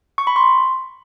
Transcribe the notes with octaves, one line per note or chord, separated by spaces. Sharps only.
C#6
B5
C6